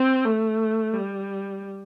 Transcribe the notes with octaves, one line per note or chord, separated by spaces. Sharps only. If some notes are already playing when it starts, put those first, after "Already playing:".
Already playing: C4
A3
G3